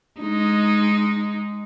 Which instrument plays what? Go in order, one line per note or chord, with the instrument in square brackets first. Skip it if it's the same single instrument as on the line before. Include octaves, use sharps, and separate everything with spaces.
[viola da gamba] G#3 D#4